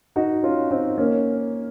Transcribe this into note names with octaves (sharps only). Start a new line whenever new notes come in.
D#4 F#4
C#4 F4
C4 D#4
A#3 C#4